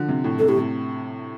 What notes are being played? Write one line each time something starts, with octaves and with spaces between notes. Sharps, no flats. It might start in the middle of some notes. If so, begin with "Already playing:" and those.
Already playing: D3 F3
C3
A2
C3 A4
A2 G4
C3